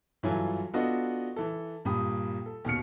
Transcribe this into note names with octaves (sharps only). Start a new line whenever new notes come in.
G2 E3 F#3 F4 A4 G#5
B3 D4 F4 F#4 A4 D#5
E3 A4
G2 A#2 G4 B5 D#6
A4
D#2 B2 F6 C#7